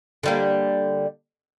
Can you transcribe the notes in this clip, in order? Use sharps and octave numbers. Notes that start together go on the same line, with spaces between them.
D3 G3 A#3